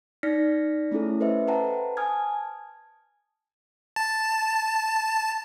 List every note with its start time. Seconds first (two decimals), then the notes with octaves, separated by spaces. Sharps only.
0.23 D#4 D5 F6 A#6 B6 C#7
0.91 A3 C#4 E4 G#4 A4
1.20 A4 B4 C5 D#5 E5
1.48 B4 C5 F#5 G5 A5 A#5
1.97 G#5 A5 D#6 F6 G#6
3.96 A5